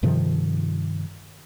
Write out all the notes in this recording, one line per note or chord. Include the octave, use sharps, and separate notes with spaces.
G2 C3 D#3 F3